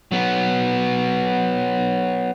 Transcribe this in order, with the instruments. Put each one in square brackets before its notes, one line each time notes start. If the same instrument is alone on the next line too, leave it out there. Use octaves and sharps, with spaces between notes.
[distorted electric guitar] F#3 B3